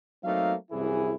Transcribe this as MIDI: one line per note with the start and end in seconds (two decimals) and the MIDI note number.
0.24 0.54 54
0.24 0.54 57
0.24 0.54 58
0.24 0.54 60
0.24 0.54 63
0.24 0.54 77
0.71 1.13 36
0.71 1.13 42
0.71 1.13 52
0.71 1.13 64
0.71 1.13 68